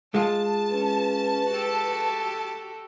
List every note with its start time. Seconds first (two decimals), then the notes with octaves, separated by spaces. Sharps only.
0.14 G#3 F4 A5
0.70 C#4 B4
1.49 F#4 G4 A4